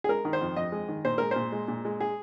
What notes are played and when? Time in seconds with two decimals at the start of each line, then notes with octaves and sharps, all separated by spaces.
0.04 G#4
0.09 G#3 A#4
0.25 D#3
0.33 C5
0.41 F2
0.56 F2 D#5
0.72 G#3
0.88 D#3
1.05 A#2 C5
1.18 G#3 A#4
1.31 A#2 C5
1.52 G#3
1.68 A#2
1.85 G#3
2.01 G#4